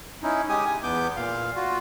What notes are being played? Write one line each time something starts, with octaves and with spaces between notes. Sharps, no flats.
C#4 D#4 E4
G#3 G4 G#5 D#6
G#5
E2 B3 D6 G6
A#2 F5
F4 F#4